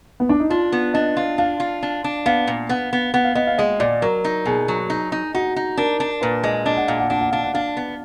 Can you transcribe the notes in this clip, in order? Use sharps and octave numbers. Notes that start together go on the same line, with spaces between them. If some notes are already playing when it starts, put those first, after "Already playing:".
B3
D4
D#4
D4 F4
B3
D4 D#5
F4
D4 F5
F4
D4
D4
B3 F5
A#2
B3 F#5
B3
B3 F#5
F5
B3 D#5
F5
G#3 D#5
A#2 D5
F#3 A#4
D#4
B2 G#4
F#3
D#4
D#4
D#4 F#4
D#4
D4 A#4
D4
A#2 B4
G#3 D#5
D4 D#5
F#5
A#2 F5
F#5
D4 F#5
F#5
D4 F5
F#5
D4 F5
B3